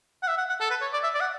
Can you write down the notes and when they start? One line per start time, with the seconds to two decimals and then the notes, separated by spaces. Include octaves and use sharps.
0.23 F#5
0.27 E5
0.38 F#5
0.49 F#5
0.60 A4
0.70 B4
0.81 C#5
0.93 D5
1.03 E5
1.14 D5
1.20 F#5